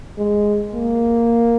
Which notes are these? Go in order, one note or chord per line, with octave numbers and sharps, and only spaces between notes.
G#3
A#3